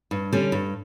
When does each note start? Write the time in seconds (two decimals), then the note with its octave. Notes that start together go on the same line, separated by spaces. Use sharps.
0.11 G2
0.32 D3 G3 C#4
0.52 G2